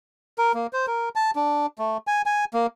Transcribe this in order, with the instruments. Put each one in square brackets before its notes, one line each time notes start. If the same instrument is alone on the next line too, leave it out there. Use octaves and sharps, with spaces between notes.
[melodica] A#4
A#3
C5
A#4
A5
D4
A3
G#5
G#5
A#3